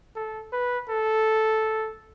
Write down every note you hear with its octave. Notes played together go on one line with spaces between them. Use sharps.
A4
B4
A4